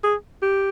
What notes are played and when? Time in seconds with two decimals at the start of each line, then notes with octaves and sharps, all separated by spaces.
0.04 G#4
0.42 G4